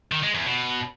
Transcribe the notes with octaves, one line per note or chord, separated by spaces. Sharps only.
D#3
G#3
E2
B2